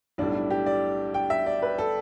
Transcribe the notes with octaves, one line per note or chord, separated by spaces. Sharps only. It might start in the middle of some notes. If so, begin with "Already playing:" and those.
B1 A2 G3 D4
E4
G4
D5
G5
E5
D5
B4
A4